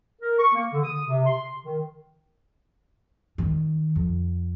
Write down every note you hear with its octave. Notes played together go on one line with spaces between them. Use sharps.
A#4
C#6
A#3
D3
D#6
C3
C6
D#3
D#3
F2